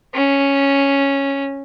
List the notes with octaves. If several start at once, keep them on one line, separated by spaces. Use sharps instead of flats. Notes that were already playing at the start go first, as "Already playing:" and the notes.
C#4